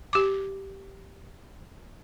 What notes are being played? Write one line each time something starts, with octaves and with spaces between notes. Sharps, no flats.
G4 D6